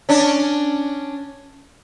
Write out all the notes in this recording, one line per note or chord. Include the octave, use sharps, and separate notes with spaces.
C#4 D4